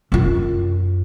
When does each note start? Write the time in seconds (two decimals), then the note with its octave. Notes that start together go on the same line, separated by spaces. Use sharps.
0.12 F#2 F4